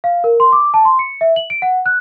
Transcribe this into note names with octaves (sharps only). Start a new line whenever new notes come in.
F5
A#4
C6
D6
A5
C6
C#7
E5
F#7
D7
F#5
F#6